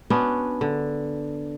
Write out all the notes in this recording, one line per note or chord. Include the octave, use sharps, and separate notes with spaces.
B3 C#4 D4 F#4
D3